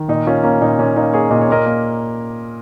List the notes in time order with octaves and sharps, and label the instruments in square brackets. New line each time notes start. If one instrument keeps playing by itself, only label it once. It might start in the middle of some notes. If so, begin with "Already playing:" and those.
Already playing: [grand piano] D#3
A#2 D#4
A#3 C#4 F4
A#3 C#4
A#2 D#4
A#2 C#4
A#3 D#4
A#3 G#4 C#5
A#2 D#5
C#5
A#2 A#4 D#5
A#3